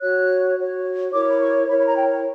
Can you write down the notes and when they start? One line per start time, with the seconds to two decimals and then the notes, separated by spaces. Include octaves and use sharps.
0.01 F#4 C#5 F#6
0.57 F#4 C#5
1.12 E4 A#4 C#5 D6
1.30 B5
1.40 C#6
1.68 E4 A#4 C#5 B5
1.78 B5
1.87 A#5
1.96 G5